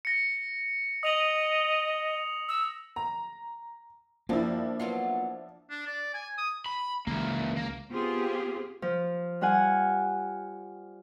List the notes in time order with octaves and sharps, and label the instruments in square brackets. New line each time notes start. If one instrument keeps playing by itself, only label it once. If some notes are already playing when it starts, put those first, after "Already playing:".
[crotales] A#6 C#7
[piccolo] D#5 [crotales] D#6 F7 F#7
[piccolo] E6
[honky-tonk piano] A#5
[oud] F#2 G3 [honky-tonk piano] F3 D4 E4 [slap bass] A#3
[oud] F#3 B3 F4
[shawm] D4
D5
G#5
D#6
[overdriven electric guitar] B5
[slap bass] C#2 [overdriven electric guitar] E3 A#3
[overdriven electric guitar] A#3
[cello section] B3 C4 F4 G4 G#4
[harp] F3
G3 F4 F#5 G#5